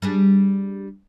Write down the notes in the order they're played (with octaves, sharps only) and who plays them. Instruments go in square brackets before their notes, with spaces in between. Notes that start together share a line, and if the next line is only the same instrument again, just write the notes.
[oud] G3 D4 G#4